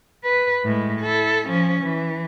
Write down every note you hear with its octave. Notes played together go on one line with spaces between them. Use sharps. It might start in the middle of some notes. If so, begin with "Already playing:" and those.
B4
A2 G#3
E4 A4
F3 C#4
E3